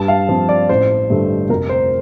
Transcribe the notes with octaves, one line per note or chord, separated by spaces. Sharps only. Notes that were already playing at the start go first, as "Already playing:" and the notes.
Already playing: G2 A5
F5
F3 C4
D5
A1 C5
G2 D3 A3
F1 A#4
C5